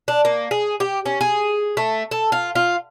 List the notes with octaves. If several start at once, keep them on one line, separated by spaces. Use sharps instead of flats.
D4
A#3
G#4
G4
C#4
G#4
A3
A4
F4
F4